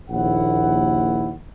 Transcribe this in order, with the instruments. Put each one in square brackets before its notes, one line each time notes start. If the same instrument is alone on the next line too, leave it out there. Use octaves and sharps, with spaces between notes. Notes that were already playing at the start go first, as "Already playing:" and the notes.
[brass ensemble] A#1 D#2 E4 F#5